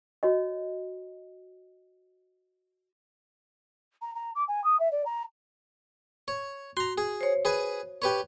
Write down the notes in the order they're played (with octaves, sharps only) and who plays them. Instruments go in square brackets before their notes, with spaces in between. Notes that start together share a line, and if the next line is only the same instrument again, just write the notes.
[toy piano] F#4 C#5 D#5
[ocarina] A#5
A#5
D6
G#5
D#6
E5
D5
A#5
[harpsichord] C#5
[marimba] F#4 [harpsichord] A#5 C6
[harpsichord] G#4
[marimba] C5 C#5
[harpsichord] G#4 B4 G#5
G4 B4 C#5